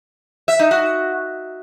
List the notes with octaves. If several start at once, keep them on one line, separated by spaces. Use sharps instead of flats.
E5
D#4
F#4